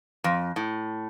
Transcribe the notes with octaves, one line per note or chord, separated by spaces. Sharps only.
F2
A2